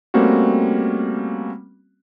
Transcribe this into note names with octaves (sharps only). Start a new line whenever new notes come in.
G3 A3 A#3 C4 C#4 F#4